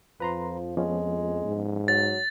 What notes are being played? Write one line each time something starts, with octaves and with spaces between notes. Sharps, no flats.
F2 F3 B4 A#5 C6
F3 G#3 B3 C#4
G#2
F#3 A6